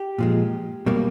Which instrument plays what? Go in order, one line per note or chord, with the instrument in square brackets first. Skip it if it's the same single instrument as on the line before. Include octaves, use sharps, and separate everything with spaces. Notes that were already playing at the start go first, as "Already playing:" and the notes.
Already playing: [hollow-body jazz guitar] G4
A#2 F3 G#3
B2 G3 A#3